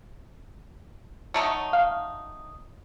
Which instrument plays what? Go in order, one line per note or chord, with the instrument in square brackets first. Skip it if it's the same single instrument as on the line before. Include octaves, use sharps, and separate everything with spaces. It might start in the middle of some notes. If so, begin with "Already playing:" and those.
[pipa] F#3 A3 D#4
[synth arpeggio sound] F5